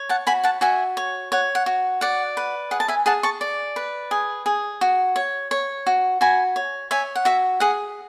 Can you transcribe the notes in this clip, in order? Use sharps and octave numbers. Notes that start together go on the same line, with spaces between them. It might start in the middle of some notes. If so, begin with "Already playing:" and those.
Already playing: C#5
F#5 A5
F#4 G#5 B5
F#5 A5
F#4 E5 G#5
C#5
C#5 F#5
F#5
F#4
D5 F#5
B4
G#4 F#5
A5
E5 G#5
G#4 F#5 A5
A5 C#6
D5
B4
G#4
G#4
F#4
C#5
C#5
F#4
F#4 G#5 B5
C#5
C#5 E5 G#5
F#5
F#4 E5
G#4 F#5